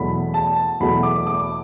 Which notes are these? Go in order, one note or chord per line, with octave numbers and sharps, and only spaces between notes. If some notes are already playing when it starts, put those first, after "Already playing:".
Already playing: E2 B2 F#3 A3 B5
A5
E2 B2 F#3 A3 B5
D6
D6